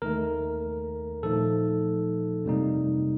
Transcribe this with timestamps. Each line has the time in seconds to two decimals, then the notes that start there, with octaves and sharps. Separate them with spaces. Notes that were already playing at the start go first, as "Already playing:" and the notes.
0.02 D#2 D#3 A3 A#4
1.23 A#2 F3 A3 D#4 A4
2.45 F2 C3 G3 A#3 D#4